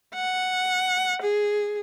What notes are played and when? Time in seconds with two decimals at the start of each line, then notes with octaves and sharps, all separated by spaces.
0.15 F#5
1.22 G#4